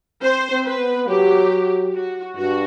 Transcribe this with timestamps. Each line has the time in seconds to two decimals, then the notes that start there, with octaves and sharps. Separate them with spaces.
0.22 C4 C5
0.51 C4
0.65 B4
0.79 B3
1.08 F#3 G4
1.94 F#4
2.36 G2 F#4